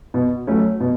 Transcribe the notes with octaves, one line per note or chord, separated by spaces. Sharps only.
B2
F#3 A3 C#4
B2